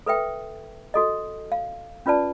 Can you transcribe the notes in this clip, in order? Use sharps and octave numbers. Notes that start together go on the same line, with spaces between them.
A4 B4 E5 G5
F#4 A4 D#5
F5
C#4 F4 B4 D5 A5